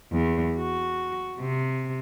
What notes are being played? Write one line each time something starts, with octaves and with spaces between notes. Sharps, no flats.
E2
F#4
C3